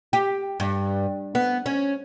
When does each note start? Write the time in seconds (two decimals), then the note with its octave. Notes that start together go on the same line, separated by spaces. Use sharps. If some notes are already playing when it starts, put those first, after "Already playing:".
0.13 G4
0.60 G2
1.35 B3
1.66 C#4